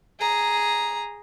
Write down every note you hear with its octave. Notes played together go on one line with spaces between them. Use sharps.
G#4 A#5